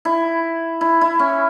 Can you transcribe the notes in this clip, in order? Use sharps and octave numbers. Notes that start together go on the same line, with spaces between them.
E4
E4
E4
C#4